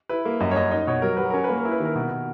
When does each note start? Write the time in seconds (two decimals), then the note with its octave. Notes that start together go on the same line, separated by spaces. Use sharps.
0.09 E4 B4
0.25 A#3
0.40 F#2 D#5
0.51 C#5
0.56 F#2 D#5
0.71 D#4 D#5
0.87 B2 C#5
1.02 F#3 A#4
1.17 F#3 B4
1.30 C#4 A#4
1.44 B4
1.49 A#3
1.58 A#4
1.65 E4
1.72 B4
1.80 D#3
1.85 A#4
1.95 B2
2.11 B2